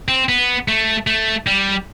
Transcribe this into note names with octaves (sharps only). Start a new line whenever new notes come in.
C4
B3
A3
A3
G3